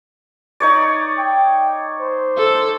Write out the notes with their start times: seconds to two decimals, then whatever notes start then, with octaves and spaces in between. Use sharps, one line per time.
0.60 D#4 C#5 D5
1.18 G5
2.00 C5
2.37 A4